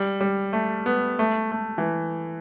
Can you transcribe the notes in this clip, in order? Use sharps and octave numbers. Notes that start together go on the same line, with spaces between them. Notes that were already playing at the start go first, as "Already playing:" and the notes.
Already playing: G3
G3
A3
B3
A3
A3
E3